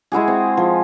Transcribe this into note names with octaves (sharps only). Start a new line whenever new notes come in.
G#3 E4 F#4 G#4
C4
F3